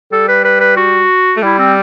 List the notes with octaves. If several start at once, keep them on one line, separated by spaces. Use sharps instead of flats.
G3 A4
B4
B4
B4
F#4
A3
G3 E4
C4